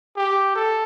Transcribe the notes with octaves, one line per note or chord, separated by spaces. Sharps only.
G4
A4